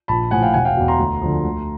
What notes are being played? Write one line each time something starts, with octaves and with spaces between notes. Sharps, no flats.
A#1 A5 B5
A2 F3 F#5 G#5
F5 G5
E1 F#5 G#5
F5 G5
E2 B2
A#5 C6
D2
D3 F3
D2